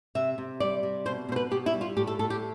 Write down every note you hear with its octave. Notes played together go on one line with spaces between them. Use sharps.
C3 E5
C3
G3 D5
C3
B2 C5
B2 C5
B4
B2 G4
E4
G3
F4
A2 G4
A4
A2 A4
G4